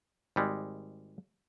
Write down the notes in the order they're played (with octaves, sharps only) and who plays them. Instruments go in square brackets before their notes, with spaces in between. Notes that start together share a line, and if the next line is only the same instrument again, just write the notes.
[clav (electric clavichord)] G#1 G3 G#3